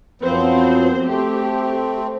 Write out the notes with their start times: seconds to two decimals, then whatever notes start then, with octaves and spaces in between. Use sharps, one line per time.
0.22 F#2 F3 B3 C4 C5
1.05 A3 C4 G4